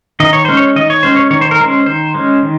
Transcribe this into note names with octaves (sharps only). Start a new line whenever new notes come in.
D#3 D#5
C#5
G#3 C#4 C5
C#5
D#3 D#5
C#5
G#3 C#4 C5
C#5
D#3 C#5
C5
A#4
G#3 C#4 C5
D#3 C5
G#3 C#4
D#3